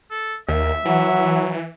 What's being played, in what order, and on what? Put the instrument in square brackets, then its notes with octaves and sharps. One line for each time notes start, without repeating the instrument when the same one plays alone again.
[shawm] A4
[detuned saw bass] D#2 [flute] A#4 [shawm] E5
[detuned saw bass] E3 [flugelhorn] F#3 [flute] F#5